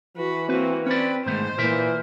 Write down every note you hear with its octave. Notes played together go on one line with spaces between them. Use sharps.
E3 F#4 B4
A#3 C4 F#4 B4
C4 C#4 B4 D5
G#2 D#3 A3 B3 C5
A#2 E3 A#4 E5